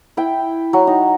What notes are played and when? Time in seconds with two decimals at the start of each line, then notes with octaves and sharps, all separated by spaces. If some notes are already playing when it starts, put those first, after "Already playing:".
0.17 E4 G5
0.73 F#3
0.87 D#4